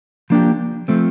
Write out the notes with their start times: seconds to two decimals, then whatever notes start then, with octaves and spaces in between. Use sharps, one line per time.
0.30 F3 A#3 D4 G4
0.88 F3 A3 C4